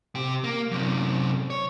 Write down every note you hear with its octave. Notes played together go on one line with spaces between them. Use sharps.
C3 G4
A#3
F#2 C3
C#5